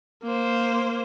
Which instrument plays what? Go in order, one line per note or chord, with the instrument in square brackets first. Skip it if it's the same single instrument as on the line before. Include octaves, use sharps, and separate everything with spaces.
[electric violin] A#3 C5